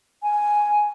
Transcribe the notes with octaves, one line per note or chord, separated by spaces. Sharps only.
G#5